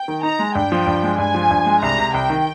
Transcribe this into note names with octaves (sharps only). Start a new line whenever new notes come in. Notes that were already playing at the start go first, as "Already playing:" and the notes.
Already playing: G5
D#3
D#4 A#5
G#3
G2 G5
F3
G2
G#3
G2 G#5
F3
G2
G#3
C2 A#5
C3
C2 G5
D#3